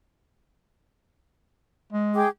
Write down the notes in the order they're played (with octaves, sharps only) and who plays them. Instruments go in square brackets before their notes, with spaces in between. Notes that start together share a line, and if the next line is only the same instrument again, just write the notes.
[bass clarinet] G#3
[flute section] G#4 G5 D6